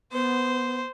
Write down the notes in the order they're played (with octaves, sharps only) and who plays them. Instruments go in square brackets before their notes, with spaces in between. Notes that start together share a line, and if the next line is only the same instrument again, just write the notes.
[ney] B3 [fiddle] C5